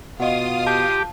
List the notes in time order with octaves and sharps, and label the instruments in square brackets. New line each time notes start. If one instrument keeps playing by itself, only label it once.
[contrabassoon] B2 [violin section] F4 F5 D#6 [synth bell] D#5 F#5
[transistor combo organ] G4 [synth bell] A5